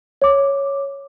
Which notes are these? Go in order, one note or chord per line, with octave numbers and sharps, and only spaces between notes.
C#5 D6